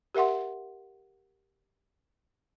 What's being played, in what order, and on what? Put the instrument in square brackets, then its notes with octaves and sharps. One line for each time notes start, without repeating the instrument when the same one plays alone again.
[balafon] G4 A#4 E5 F#5 C6